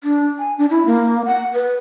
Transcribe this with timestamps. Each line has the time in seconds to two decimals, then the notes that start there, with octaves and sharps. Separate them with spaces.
0.04 D4
0.39 G#5
0.58 D4
0.70 E4
0.86 A#3
1.26 F#5
1.54 B4